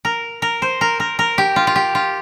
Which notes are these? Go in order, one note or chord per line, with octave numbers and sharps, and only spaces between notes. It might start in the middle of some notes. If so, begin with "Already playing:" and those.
A#4
A#4
C5
A#4
A#4
A#4
G4
F4
F4
G4
F4